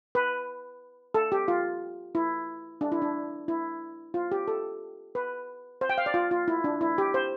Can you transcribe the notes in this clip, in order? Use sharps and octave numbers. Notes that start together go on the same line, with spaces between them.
B4
A4
G4
F4
E4
D4
E4
D4
E4
F4
G4
A4
B4
C5
G5
F5
D5
F4
F4
E4
D4
E4
G4
C5